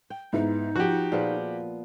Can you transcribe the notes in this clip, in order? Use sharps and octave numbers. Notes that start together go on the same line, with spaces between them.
G5
G#2 B3 D#4 E4
F3 F#4 G4
A#2 F3 B3 G#4